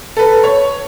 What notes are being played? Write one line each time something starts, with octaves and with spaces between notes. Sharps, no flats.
A4 B4
C#5